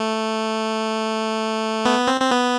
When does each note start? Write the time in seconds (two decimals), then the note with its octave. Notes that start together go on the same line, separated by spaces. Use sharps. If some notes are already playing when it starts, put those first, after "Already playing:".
Already playing: A3
1.85 B3
2.07 C4
2.21 C4
2.31 B3